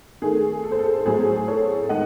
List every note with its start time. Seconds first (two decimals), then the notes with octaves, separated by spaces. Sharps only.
0.22 D#3 A3 G#4
0.64 A4
0.72 C5
0.79 A4
1.05 A2 F#3 A3 G#4 C5
1.48 A4 C#5
1.89 D#3 G#3 D#5 F#5